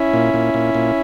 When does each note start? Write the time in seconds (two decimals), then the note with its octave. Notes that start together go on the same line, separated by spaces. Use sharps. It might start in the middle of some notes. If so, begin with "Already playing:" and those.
Already playing: C#4 E4
0.13 A#2
0.34 A#2
0.54 A#2
0.75 A#2